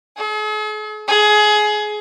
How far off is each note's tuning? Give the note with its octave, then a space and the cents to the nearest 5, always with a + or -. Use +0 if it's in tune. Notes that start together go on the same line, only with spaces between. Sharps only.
G#4 +45
G#4 +20